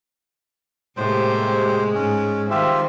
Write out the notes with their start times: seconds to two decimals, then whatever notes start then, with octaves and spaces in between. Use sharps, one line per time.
0.97 A2 C3 G#3 A#3 G4 C5
1.95 G#2 C#4
2.50 D#3 G3 C4 F4 G4 E5